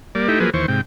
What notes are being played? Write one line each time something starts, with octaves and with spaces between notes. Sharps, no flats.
G3 A#3 D5
A3 D#4 E4 G4
F3 F#3 A#3 G#4 B4
D#2 E3 C5 C#6
G#2 C3 G5